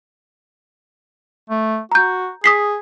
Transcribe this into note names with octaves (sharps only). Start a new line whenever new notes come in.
A3
F#4 A#5 G6
G#4 D#6 B6 C7